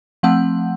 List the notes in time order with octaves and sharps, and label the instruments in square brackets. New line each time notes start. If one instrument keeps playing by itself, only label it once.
[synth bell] F3 A3 C4 F#5